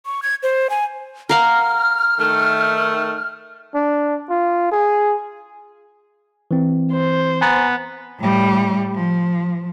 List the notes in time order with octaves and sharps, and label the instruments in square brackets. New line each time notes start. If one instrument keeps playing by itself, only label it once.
[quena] C#6
G#6
C5
G#5
[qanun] A#4 F5 F#5 [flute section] F6
[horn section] D#3 A3
[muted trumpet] D4
F4
G#4
[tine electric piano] E3 C4
[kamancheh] C5
[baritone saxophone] B3 [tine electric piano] G#5 A#5 A6
[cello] A2 G3
F3